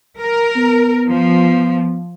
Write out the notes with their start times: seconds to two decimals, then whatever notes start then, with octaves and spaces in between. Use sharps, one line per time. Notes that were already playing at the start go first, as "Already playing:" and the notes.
0.20 A#4
0.56 B3
1.10 F3